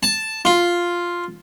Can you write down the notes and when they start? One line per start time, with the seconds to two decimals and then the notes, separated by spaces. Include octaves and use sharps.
0.03 A5
0.45 F4